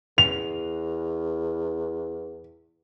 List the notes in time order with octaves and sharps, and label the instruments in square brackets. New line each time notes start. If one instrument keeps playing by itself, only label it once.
[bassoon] E2 [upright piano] F7